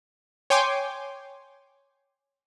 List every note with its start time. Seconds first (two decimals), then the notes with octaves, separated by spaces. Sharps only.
0.50 C#5 G5 G#5 C6 D6